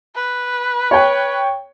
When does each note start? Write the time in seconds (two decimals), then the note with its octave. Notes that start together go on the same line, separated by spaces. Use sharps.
0.15 B4
0.91 C#5 G5